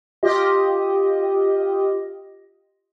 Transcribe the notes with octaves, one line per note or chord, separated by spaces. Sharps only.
F4 G4 D#5